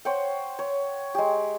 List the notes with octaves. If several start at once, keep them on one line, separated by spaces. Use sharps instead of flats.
C5 C#5 F#5 G5
C#5
G#3 G4